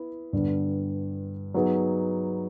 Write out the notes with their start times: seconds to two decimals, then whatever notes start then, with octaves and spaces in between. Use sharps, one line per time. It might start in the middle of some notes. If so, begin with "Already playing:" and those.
Already playing: B3 E4
0.33 G2 D3 G3 B3
1.54 F#3 B3 D#4 G#4